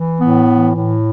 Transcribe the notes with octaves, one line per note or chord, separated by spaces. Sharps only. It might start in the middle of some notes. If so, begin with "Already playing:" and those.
Already playing: E3
A2 B3
E3
A2